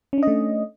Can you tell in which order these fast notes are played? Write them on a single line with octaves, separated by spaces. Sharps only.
C#4 D4 D#5 A3